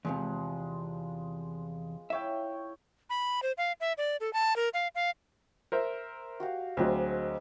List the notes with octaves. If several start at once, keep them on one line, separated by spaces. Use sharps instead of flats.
E2 A2 C3 F3 G#3
E4 C#5 E5 F5 G5
B5
C5
F5
E5
D5
A4
A5
A#4
F5
F5
A#4 C5 E5
F#4 G4 F5
D2 F#3 G#3 C4